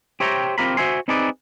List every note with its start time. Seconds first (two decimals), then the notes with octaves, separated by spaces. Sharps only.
0.20 G4 C5 C#5 E5 G5 A#5
0.58 C4 F4 G4 A#4 A#5 B5
0.77 F#4 C5 E5 G#5 C6
1.08 C4 D#4 E4 G#4 B4 D5